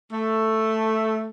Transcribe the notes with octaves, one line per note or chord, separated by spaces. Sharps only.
A3